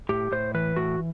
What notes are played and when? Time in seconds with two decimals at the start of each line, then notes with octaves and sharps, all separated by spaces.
0.09 A2 G4
0.32 A2 C5
0.54 E3 B4
0.76 A2 F#4